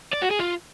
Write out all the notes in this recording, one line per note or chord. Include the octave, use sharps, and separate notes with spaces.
D5
F#4
G#4
F4